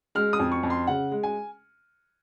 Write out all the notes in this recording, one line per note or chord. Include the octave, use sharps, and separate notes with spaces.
G#3 F6
D#6
F2
C#6
F2
C6
C#3 F#5
G#3
G#5